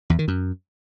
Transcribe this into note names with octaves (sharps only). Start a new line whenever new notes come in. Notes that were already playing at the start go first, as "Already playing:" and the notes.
E2
D#3
F#2